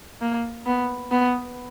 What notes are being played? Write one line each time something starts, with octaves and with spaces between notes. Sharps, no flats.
A#3
B3
B3